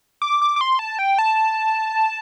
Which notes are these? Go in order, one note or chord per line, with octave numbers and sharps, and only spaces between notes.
D6
D6
D6
C6
A5
G5
A5